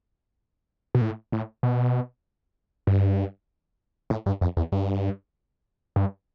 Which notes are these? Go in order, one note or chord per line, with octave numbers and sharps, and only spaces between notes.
B2
A2
A2
B2
G2
A2
G2
F2
E2
G2
G2